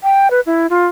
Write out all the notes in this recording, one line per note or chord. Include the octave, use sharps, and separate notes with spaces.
G5
B4
E4
F4